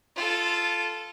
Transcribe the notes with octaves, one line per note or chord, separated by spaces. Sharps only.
F4 A4